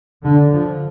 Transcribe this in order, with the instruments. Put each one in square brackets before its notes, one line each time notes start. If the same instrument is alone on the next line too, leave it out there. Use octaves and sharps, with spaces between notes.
[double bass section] D3
F3